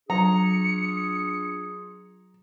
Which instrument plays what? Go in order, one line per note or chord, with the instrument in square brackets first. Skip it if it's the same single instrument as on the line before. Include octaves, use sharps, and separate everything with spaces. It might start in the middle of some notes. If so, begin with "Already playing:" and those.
[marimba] F#3 [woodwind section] D4 F4 G#4 [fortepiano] A#5 [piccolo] C#7